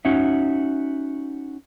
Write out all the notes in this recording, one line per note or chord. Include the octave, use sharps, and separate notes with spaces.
C#4 D#4 F#4 E5